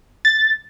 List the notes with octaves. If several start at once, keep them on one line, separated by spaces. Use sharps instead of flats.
A6